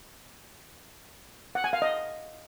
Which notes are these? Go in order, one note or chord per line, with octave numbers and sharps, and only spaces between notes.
F#5
G#5
F5
D#5